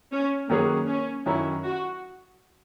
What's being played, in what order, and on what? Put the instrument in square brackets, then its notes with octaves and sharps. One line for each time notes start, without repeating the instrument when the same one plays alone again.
[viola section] C#4
[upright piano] D#3 F#3 C#4 G#4 B4 [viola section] A#3
[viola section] C#4
[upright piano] F#2 D#3 F#3 C#4 [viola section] E4
[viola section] F#4